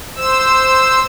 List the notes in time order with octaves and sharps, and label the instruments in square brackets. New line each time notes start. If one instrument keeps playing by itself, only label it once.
[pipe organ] C5 E6